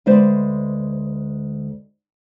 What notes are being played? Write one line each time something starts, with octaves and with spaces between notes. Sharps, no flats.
D2 G#3 B4 C5 D5